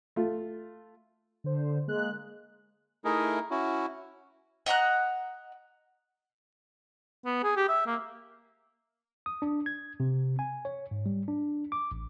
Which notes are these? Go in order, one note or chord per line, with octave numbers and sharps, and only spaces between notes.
A3 F4
D3 C5
G#3 A#3 F#6
A3 D#4 E4 G#4 A#4
C#4 E4 F#4
D#5 F#5 A#5 F#6
B3
G#4
G4
E5
A#3
D#6
D4
G#6
C3
G#5
C#5
G#2
G3
D4
D6
A1